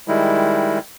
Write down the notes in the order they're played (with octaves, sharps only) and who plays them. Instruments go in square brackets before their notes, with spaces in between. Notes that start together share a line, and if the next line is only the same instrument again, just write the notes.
[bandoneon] D#3 G3 G#3 E4